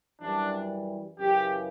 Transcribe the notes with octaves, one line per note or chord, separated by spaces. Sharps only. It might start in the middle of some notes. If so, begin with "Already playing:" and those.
F#2 E3 G3 D4
F#2 C#3 E3 G4